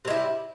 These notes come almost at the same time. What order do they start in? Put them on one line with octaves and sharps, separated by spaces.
C3 G#3 E4 G3